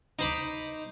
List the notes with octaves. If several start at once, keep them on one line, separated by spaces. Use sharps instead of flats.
D#4 C5 B5 D6